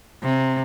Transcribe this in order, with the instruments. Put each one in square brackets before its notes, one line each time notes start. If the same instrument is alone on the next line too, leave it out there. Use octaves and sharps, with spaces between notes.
[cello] C3